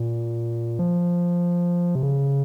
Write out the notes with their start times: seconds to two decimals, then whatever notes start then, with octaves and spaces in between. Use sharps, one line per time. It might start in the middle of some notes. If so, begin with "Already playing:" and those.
Already playing: A#2
0.79 F3
1.95 C3
2.03 C#3